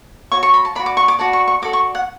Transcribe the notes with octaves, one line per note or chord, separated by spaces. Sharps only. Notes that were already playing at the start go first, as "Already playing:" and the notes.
F#4 C#5 C#6
C#6
B5
A5
F#4 B4 D5 B5
D6
C#6
D6
F#4 B4 D5 A5
C#6
C#6
F#4 A4 D5 D6
C#6
F#5